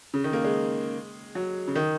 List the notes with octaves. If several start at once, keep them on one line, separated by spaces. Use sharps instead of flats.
C#3
D#3
A#3
G#3
F#3
C#3
D#3